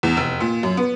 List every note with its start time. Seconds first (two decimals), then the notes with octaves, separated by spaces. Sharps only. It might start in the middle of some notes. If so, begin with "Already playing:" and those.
0.03 E2
0.17 F1
0.40 A#2
0.63 F#2
0.77 B3